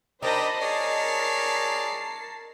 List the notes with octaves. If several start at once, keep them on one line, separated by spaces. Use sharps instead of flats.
D4 D#4 G4 A#4 C5 D#5 A5 B5
G#4 C#5 D5 C7